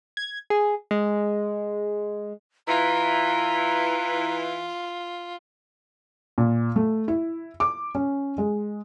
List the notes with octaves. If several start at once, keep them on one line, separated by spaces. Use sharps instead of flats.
G#6
G#4
G#3
E3 E4 F4 A#5
A#2
A3
E4
D6
C#4
G#3